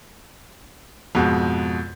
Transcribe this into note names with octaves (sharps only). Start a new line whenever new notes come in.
F2 G#2 B2